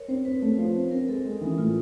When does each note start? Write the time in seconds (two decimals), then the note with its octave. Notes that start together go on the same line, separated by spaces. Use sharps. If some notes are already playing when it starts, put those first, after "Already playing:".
Already playing: A#4 C#5
0.08 C4 C5
0.25 C4 B4
0.42 A3
0.58 F3 C5
0.75 C4
0.91 C4 A#4
1.08 G#3 A4
1.25 G#3
1.41 E3 D#4
1.58 A2 F4